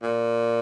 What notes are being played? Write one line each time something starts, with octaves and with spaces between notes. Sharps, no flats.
A#2